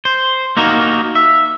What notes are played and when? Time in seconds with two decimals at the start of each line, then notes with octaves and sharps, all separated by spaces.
0.05 C5
0.57 A#3 D#4 F#4 A#4
1.15 E5